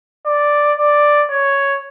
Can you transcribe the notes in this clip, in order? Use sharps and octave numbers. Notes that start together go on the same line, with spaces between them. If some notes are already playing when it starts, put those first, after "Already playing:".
D5
D5
C#5